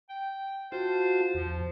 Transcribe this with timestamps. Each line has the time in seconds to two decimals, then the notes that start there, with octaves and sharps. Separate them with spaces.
0.09 G5
0.72 F4 F#4 C5 A5
1.34 E2 F3